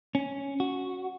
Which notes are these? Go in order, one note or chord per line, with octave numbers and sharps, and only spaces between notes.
C#4
F#4